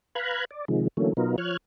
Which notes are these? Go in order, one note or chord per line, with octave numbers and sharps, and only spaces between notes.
B4 F5 A#5 B5 F#6 G#6
D5
C3 D#3 F3 G#3
D3 E3 F#3 A3 A#3 C#4
B2 F#3 B3 D#4 F4 A#4
F3 C#5 F6 F#6 G#6